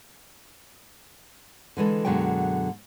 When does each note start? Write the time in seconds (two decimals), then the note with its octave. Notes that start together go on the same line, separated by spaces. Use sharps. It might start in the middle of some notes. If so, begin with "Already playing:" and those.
1.77 D3 E3 G#3 A4
2.05 F#2 B2 D3 F#3 G#3 G5